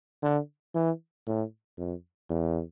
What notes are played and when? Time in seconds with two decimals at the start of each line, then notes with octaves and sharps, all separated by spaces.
0.22 D3
0.75 E3
1.27 A2
1.78 F2
2.30 E2